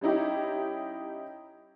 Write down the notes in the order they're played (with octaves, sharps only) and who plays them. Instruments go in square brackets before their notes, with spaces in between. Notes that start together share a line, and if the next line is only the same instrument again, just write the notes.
[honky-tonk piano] G3 C#4 D#4 E4 G4